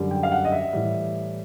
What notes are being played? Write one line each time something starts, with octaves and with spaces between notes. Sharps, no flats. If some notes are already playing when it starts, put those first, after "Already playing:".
Already playing: F#2 D3 G3
G5
F5
F#5
D#5
E5
A2 E3 G3